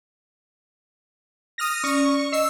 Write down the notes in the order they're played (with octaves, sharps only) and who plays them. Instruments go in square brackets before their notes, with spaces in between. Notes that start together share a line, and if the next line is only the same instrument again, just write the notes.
[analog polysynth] D#6 F6 A#6
[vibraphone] C#4 D5 [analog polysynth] C#6
[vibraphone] D#5 [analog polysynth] E6 C7